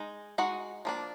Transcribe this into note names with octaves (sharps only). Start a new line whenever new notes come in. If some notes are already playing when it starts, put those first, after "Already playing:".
Already playing: G#3 D#4
G#3 D#4 F#4 F#5
F3 A#3 D4